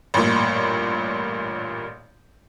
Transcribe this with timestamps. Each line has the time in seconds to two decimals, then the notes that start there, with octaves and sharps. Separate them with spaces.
0.14 A1 G2 A#2